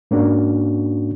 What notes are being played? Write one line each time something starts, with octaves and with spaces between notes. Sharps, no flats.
G#2 A#3 C#4 D4 F#4